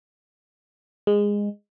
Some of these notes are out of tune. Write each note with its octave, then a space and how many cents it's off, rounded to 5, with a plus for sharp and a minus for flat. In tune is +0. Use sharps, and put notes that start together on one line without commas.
G#3 -15